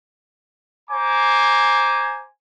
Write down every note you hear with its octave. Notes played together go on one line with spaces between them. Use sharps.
C5 G#5 A#5 D6